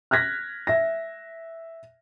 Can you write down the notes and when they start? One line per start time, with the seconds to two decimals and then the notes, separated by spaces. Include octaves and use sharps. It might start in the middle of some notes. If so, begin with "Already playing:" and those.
0.11 F6 F#6 G#6 A#6 B6
0.67 E5 A#6